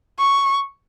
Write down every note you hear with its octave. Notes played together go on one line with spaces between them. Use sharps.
C#6